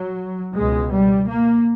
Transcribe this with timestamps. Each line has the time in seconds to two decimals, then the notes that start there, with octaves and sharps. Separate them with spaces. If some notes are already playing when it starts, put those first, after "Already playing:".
Already playing: F#3
0.55 C#2 B2 G#3
0.91 G3
1.28 A#3